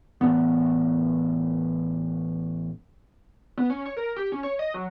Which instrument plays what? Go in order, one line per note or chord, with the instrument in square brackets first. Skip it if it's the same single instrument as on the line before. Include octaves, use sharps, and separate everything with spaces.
[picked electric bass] A1 B3
[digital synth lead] B3
C#4
C#5
A#4
G4
C#4
C#5
D#5
F#3